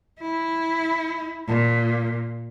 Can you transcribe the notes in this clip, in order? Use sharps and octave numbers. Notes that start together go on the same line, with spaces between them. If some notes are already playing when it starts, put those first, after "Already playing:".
E4
A#2